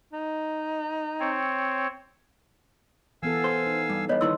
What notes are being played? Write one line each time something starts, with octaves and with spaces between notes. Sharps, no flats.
D#4
C4 C#5
E3 B3 A4 F5 G#5 E6
C5
D#4
G2
G2 B3 C#5 D#5
G2 D#3 B3 E4 C6 E6